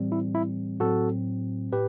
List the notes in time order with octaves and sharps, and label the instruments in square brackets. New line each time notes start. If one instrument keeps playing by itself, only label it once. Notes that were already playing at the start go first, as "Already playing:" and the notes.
Already playing: [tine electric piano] A2 E3 G3 C4
E4
E4
A2 F#3 C4 F#4 A4
A2 G4 B4